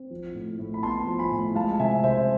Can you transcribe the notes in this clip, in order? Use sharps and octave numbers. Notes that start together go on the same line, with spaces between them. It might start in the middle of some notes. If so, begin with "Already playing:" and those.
Already playing: C4
F3
A2
A2
B5
B3 A5 C6
F3
G#5 B5
A2
G#3 F5 A5
C3 E5 G#5
C3 C5 E5